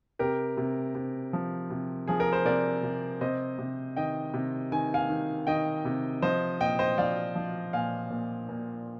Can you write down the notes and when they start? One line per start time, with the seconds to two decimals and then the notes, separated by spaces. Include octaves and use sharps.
0.19 C3 G4 A#4
0.57 C3
0.95 C3
1.33 F3
1.70 C3
2.08 F3 G#4
2.20 A#4
2.33 C5
2.45 C3 A#4 D5
2.83 C3
3.21 C3 C5 D#5
3.59 C3
3.96 D#3 D#5 G5
4.34 C3
4.72 D#3 G#5
4.94 F5 G#5
5.09 D#3
5.47 D#3 D#5 G5
5.85 C3
6.22 F3 C5 D#5
6.60 A#2 D#5 G5
6.79 C5 D#5
6.98 F3 D5 F5
7.35 F3
7.73 A#2 F5 G#5
8.11 A#2
8.49 A#2